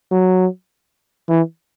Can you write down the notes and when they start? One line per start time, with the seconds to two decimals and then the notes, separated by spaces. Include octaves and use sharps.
0.11 F#3
1.29 E3